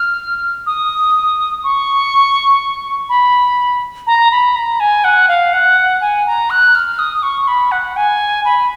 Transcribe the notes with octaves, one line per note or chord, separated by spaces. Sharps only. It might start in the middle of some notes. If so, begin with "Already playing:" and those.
Already playing: F6
D#6
C#6
B5
A#5
B5
A#5
G#5
F#5
F5
F#5
G#5
A#5
F#6
F6
D#6
C#6
B5
F#5
G#5
B5